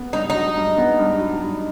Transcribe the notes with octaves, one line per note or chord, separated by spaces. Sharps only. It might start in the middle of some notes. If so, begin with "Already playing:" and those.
Already playing: B3
G2 D#4
D#4
F#3
G2
B3
G2
F#3
G2